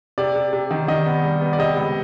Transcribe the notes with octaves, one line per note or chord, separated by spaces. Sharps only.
C3 D5
C3
C3
D#3
D#3 D#5
B3
G3
B3
D5
C3 D#5
C#2